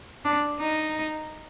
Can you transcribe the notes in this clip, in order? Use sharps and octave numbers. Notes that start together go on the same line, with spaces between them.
D4
D#4